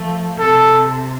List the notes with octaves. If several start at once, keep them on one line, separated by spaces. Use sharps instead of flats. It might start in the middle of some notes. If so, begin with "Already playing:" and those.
Already playing: F3 A3
C3 A4